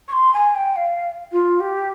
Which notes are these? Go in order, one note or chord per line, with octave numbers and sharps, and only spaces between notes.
C#6
C6
G#5
G5
F5
F4
G4